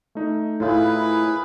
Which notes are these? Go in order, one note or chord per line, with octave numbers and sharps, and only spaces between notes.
A3 D#4
A2 E4 F4 G#4 A#4 B4